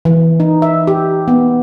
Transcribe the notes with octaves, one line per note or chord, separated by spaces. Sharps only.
E3
D#4
E5
G4
B3